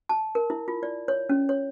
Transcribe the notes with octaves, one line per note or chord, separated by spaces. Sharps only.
A5
A#4
E4
F4
D5
C#5
C#4
C#5